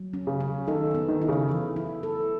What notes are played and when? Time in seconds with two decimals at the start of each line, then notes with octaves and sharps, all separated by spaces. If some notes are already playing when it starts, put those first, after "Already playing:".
Already playing: F#3
0.13 C#4
0.27 C#3
0.41 C#4
0.68 D#3 A4
0.95 B3
1.08 D#3
1.22 E4
1.28 C#3
1.49 E3
1.76 E4
2.03 A4